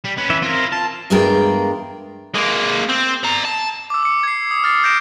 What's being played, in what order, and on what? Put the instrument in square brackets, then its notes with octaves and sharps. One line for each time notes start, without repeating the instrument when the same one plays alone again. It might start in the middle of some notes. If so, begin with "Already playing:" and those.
[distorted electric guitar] G3
C#4 B4
[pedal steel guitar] E3 E5
[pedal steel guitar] C4 A#4 [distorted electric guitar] E4 F4
[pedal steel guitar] F4 [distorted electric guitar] A5
[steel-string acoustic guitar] E2 G2 G#3 F4 A#4 G5
[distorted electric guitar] G#3 A#3
C4
D5 A#5
A5
[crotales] D6 E6
D6 C#7
G#6 C7
D#6
F6 A6 C7
F6 G6 A#6 D7 E7